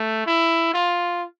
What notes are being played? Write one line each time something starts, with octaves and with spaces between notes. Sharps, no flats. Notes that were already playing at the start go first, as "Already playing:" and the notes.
Already playing: A3
E4
F4